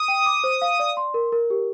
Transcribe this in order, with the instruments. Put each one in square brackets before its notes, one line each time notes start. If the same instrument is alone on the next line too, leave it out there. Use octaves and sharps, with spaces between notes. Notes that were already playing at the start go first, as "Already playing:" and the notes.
Already playing: [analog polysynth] D#6
[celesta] G5
D6
C5
F5
D5
C6
A#4
A#4
G4